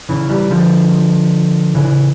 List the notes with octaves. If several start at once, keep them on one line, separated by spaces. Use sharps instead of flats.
C#3 E3
E3 G3
D3 F3
C#3 E3